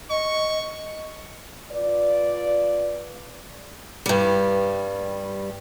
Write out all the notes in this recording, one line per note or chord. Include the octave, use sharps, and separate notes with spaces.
D#5 C#6
F4 B4 D5
G2 G3